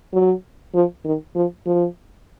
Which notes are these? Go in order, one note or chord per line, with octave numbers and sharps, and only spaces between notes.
F#3
F3
D#3
F3
F3